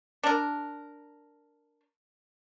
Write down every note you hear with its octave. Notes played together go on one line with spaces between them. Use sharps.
D4 A#4